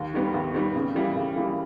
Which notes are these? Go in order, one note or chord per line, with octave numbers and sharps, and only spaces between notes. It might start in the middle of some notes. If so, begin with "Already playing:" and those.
Already playing: D#2
D#3 G3 B3
D#2
D#3 G3 B3
C#3
E3 G3 A#3
C#3
E3 G3 A#3